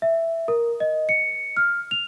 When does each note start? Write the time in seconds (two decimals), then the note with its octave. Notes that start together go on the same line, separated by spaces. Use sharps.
0.02 E5
0.48 A#4
0.80 D#5
1.09 C#7
1.57 F6
1.91 F7